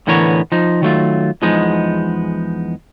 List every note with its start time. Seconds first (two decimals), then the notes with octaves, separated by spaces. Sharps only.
0.07 A2 D3 E3 B3 A#4 C#5
0.52 F3 D#4
0.81 D#3 F#3 A3 F4
1.42 E2 F3 G#3 B3 D#4